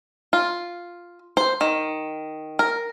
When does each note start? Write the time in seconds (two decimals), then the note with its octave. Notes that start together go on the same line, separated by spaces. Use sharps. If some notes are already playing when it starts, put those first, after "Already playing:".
0.33 F4
1.37 C5
1.61 D#3
2.59 A#4